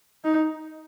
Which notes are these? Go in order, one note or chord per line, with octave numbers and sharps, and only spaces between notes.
D#4